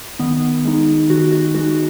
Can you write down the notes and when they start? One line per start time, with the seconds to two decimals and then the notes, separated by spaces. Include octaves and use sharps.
0.19 D#3 B3
0.65 G#3 D#4
1.10 D#3 F#4
1.32 F#4
1.54 G#3 D#4 F#4